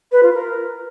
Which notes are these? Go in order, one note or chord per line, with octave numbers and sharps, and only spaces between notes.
B4
F4
A#4